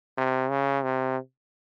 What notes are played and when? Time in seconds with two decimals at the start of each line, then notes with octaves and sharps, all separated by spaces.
0.17 C3
0.50 C#3
0.83 C3